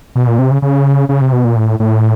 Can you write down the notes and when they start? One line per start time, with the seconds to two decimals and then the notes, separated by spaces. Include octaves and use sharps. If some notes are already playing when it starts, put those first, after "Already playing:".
0.16 B2
0.27 A#2
0.39 C3
0.51 C#3
0.62 C#3
1.09 C#3
1.21 C3
1.33 B2
1.44 A#2
1.56 A2
1.80 A2